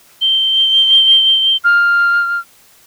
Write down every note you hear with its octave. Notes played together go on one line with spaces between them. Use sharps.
G7
F6